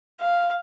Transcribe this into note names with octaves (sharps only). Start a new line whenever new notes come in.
F5